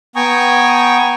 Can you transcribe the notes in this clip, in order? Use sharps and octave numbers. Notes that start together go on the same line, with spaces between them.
B3 G5 G#5 A#5 C#6 D#6